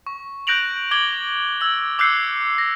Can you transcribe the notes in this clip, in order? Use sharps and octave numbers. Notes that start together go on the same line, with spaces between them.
C#6
F#6 G6 A#6 D7 F7 F#7
D6 G#6 F#7 G7
E6 G#6 F#7
D6 E6 F#6 G6 C7 C#7
A#6